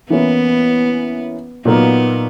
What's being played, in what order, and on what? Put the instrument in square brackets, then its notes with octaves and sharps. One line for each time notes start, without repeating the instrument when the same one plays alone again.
[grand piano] E3 A#3 C#4 E4 [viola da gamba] B3
[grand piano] A#2 F#3 A#3 D#4 [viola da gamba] B3